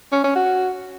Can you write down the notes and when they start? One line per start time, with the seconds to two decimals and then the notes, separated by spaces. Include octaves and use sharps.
0.12 C#4
0.24 C#4
0.35 F#4